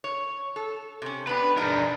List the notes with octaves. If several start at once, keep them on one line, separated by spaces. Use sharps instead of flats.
C#5
A4
C3 C#4
B3 D4 G4 B4
G#3 D4 D#4 G#4 A#4